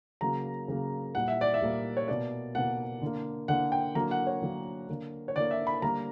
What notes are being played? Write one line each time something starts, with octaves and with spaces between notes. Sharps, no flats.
C#3 F#3 A#3 A#5
C#3 F#3 A#3
A#2 G3 A#3 F#5
E5
D5
E5
A#2 G3 A#3
C#5
B2 A#3 D5
B2 A#3 F#5
D3 A#3
D3 A#3 F#5
G5
D3 F#3 A#3 A#5
F#5
C#5
D3 F#3 A#3
D3 A#3
C#5
D3 A#3 D5
E5
B5
D3 G3 A#3 A#5